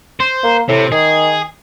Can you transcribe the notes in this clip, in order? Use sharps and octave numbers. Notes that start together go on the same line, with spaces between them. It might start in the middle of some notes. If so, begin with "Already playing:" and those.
C5
A#3
A2 C3
D#3 G#4